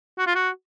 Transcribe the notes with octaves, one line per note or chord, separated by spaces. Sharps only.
F#4
F4
F#4